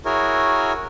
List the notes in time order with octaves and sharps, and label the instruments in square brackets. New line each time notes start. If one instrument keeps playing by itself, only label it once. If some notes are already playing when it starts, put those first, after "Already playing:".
[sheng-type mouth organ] E4 F#4 G#4 A#4 C#5